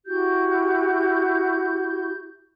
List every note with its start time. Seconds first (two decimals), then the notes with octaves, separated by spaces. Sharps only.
0.06 E4 F#4 G4 G6